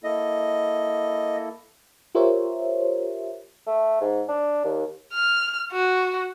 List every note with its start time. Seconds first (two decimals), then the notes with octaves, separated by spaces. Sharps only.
0.04 A#3 E4 A4 D#5
2.15 F4 G4 A#4 C5 C#5 E5
3.67 A3
4.01 G#2
4.29 D4
4.65 D#2
5.13 F6
5.72 F#4